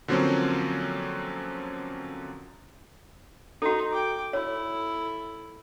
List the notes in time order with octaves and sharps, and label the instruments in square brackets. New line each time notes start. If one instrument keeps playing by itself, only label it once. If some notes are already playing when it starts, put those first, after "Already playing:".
[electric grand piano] D3 F3 F#3 A#3 C4 C#4
[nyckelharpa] D#4 [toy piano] F#4 A4
[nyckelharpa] G5 D6
[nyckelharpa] E4 A4 [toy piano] C#5